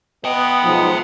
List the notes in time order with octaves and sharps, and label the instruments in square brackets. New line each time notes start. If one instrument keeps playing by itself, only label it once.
[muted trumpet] B3 [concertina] D#5 [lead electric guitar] E5 G5
[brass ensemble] B1 G#2 F3